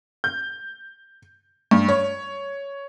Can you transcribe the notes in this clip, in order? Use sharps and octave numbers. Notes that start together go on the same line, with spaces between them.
G6
G2
C#5